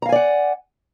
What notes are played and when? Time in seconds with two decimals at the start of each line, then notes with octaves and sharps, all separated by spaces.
0.02 A#5
0.06 F5
0.09 G#5
0.12 D5
0.16 F#5